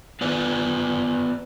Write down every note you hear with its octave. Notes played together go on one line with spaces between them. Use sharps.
B3 F4 B4 D5